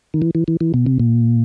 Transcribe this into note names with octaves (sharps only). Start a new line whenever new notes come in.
D#3
E3
E3
E3
E3
B2
C3
A#2